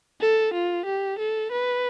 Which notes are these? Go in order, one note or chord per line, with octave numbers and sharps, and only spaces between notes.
A4
F4
G4
A4
B4